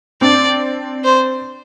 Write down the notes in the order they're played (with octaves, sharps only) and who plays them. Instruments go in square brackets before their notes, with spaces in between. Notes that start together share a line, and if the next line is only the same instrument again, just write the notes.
[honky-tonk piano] C4 D4 [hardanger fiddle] D5
[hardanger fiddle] C5